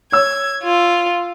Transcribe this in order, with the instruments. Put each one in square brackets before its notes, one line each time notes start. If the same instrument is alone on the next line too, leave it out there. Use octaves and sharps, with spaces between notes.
[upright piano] C#5 E6 [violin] G#6
[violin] F4